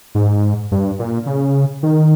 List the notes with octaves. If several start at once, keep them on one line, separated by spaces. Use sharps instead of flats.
G#2
G2
A#2
C#3
D#3